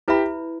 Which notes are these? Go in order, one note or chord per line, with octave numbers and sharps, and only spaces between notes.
E4 G4 B4 E5 B5